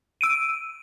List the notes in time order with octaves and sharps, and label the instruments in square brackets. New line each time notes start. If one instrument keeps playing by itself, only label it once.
[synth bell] E6 D7 D#7